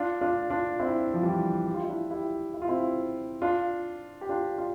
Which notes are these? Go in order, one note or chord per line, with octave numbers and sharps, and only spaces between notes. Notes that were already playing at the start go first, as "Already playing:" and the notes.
Already playing: D4 F4
D4 F4
D4 F4
C4 E4
F3
E3 G3
G4
F4
E4
D4 F4
E4 G4
E4
F4
C4 E4
D4 F4
G4
D4 F4
D4 F4